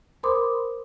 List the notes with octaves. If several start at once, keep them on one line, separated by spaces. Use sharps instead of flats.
A#4 C5 B5 C6 D6 D#6